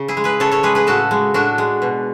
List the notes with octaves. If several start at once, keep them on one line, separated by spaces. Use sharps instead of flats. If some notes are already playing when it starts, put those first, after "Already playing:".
Already playing: C#3
E4 G#4
G#3
G#4 B4
C#3 A4 C#5
A4 C#5
G#3 G#4 B4
G#4 B4
A2 F#4 A4
G#3
A2 D4 F#4
G#3
B2